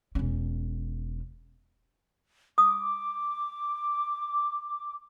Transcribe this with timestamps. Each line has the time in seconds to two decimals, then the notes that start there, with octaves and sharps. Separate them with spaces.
0.15 E1 C#4
2.58 D6 D#6